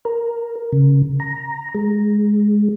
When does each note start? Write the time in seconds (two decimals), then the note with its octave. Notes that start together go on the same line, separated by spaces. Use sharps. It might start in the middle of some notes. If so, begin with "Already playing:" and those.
0.05 A#4
0.72 C#3
1.20 A#5
1.75 G#3